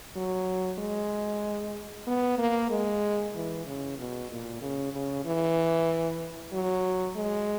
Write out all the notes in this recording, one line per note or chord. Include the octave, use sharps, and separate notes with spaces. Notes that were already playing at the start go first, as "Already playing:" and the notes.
F#3
G#3
B3
A#3
G#3
E3
C#3
B2
A#2
C#3
C#3
E3
F#3
G#3